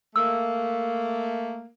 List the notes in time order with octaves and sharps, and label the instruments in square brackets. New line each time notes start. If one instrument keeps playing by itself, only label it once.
[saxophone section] A3 A#3 [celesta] E6